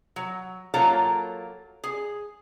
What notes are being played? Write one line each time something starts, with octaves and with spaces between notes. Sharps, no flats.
F#3
F#3 A#3 F4 A4 C#5 A#5
G#4